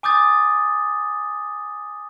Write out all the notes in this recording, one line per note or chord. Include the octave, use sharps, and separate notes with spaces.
G#5 D6 D#6 G6 A6